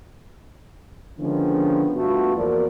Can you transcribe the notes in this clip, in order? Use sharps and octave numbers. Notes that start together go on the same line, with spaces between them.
D3 D#3 F3 G#3 B3 C#4
G2 A3 B3 F4 F#4
E2 F3 A#3 F#4 A#4 D5